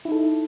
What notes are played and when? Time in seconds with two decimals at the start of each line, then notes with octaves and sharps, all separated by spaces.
0.05 E4
0.08 D#4
0.12 A4